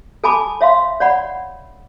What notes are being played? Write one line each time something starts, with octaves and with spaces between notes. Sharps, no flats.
A4 G#5 A5 B5 D6
C#5 E5 F5 C6
C#5 D5 F#5 B5